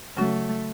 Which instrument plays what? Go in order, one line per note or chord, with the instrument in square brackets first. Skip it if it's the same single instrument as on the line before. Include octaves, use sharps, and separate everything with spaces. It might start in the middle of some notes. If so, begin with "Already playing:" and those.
[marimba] C#3 F#3 C#4 F#4 [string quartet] A3